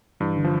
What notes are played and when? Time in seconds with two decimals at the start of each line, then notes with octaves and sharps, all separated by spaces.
0.20 G2 E3
0.37 D3
0.44 F3